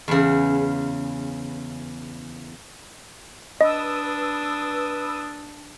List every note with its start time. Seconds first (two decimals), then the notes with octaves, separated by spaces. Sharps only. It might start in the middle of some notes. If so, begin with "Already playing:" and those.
0.08 E2 C#3
3.61 D4 B4 D#5 D#6 E6